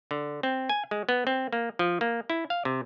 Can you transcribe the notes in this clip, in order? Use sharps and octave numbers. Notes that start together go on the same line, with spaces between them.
D3
C4
G#5
G#3
B3
C4
A#3
F3
A#3
E4
F5
C3